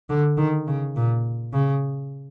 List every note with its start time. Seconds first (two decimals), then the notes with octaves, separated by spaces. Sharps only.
0.10 D3
0.37 D#3
0.67 C#3
0.96 A#2
1.53 C#3